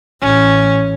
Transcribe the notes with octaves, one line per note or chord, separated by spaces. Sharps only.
A1 C#4